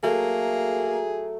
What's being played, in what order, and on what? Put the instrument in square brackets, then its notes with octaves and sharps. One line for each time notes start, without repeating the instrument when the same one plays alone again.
[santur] F#3 A3 [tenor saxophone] A#3 [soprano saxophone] G#4